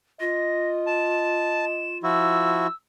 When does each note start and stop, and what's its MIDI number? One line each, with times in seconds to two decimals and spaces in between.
0.20 2.16 65
0.20 2.00 75
0.20 0.69 94
0.87 1.65 81
0.87 1.98 100
2.03 2.67 53
2.03 2.67 64
2.03 2.67 66
2.03 2.73 88